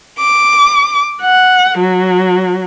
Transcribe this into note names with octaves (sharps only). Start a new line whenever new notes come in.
D6
F#5
F#3